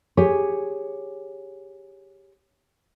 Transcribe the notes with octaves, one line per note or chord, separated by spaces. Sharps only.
G4 G#4 C#5